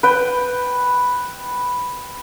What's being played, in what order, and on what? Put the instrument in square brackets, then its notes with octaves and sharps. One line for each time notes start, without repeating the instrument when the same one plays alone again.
[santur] B4 G5